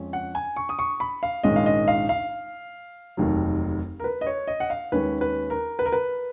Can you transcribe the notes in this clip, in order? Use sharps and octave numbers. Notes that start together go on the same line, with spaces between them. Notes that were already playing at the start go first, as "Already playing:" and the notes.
Already playing: F2 F3 G#3 C#4
F#5
G#5
C#6
D#6
C#6
B5
F5
A#1 G#2 D#3 G#3 C#4 D#5
F5
D#5
F5
F5
F1 D#2 D#3 F#3
A#4
B4
D#5
C#5
D#5
F#5
F5
D#2 D#3 G#3 C#4 B4
B4
A#4
B4
A#4
B4